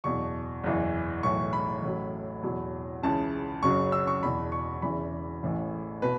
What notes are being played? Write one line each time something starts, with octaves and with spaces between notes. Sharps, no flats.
F#1 E2 B2 C#6
F#1 E2 E3
B1 A2 E3 C#6
B5
A1 A2 F#3
E2 B2 F#3
C#2 C#3 E3 A5
F#1 F#2 C#3 F#3 C#6
E6
C#6
E1 E2 B2 B5
C#6
E1 E2 C#3 E3 B5
A1 A2 E3
B2 B4